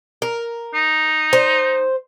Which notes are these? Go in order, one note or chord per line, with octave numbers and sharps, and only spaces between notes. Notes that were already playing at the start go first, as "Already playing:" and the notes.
A#4
D#4
C5